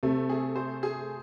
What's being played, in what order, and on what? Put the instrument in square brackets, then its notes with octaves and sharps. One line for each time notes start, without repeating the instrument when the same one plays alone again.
[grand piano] C3 [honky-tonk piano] A3
[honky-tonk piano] G#4
C5
G#4